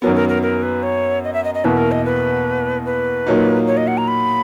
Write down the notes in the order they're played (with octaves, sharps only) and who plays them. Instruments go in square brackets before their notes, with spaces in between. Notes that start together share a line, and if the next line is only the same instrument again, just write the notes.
[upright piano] F#2 D#3 F#3 B3 [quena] A#4
[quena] A#4
A#4
A#4
B4
C#5
D#5
E5
D#5
D#5
[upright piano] E2 B2 A#3 E4 [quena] B4
[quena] A#4
D#5
B4
B4
[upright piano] A#2 F#3 A#3 D#4
[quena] C#5
D#5
F#5
A#5
B5